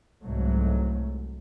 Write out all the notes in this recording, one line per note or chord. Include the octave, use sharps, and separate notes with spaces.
C2 G#2 F#3 A3